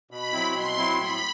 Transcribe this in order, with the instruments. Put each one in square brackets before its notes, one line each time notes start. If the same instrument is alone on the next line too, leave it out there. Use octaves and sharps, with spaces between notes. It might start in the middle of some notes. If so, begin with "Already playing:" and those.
[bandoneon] B2 [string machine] B5
[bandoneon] F#3 C4 E4
[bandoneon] B2 [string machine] C6
[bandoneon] F#3 C4 E4
[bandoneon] A2 [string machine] B5